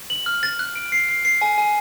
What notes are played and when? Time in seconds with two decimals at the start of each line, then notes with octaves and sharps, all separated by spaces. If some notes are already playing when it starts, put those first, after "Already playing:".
0.10 F#7
0.26 F6
0.43 A6
0.59 F#6
0.76 D7
0.92 C7
1.09 C7
1.25 C7
1.41 G#5
1.58 G#5